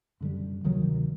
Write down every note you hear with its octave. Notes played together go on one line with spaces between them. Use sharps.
F#2 D3 G3
D2 C3 D#3 F#3